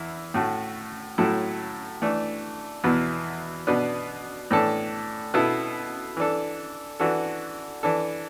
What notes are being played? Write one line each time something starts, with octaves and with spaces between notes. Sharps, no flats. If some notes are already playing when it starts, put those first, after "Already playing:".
Already playing: E2 E4
A2 A3 F#4
A2 F#3 A3 E4 A4
E3 A3 D4 A4
E2 B2 B3 E4
B2 B3 D4
A2 E3 D4 A4
B2 B3 E4 A4
E3 D4 A4
E3 D4 F#4 A4
E3 D4 A4